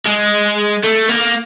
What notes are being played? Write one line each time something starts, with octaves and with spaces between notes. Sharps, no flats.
G#3
A3
A#3